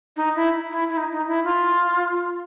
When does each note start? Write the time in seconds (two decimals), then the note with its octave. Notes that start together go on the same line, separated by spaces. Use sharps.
0.16 D#4
0.36 E4
0.71 E4
0.90 E4
0.97 D#4
1.12 D#4
1.27 E4
1.45 F4